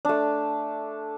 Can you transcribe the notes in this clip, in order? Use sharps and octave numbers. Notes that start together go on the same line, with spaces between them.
A3 D4